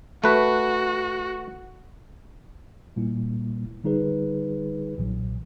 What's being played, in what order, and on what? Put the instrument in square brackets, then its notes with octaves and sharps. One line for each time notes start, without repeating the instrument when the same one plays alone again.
[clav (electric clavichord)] A3 B4 [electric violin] F#4
[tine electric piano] A#2 G3 A#3 E4
D3 G3 D#4 G#4 B4
B1 A#2 E3 F#3